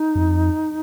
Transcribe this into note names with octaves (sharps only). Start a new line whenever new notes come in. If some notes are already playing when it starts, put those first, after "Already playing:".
Already playing: D#4
F#2
F2